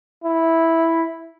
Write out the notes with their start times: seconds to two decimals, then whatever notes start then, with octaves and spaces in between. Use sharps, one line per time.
0.24 E4